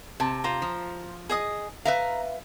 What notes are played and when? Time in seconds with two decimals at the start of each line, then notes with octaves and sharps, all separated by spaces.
0.20 C3 A5
0.44 F4 C5 A#5
0.62 F3
1.29 G#4 D#5 D#6
1.85 B4 E5 F5 A#5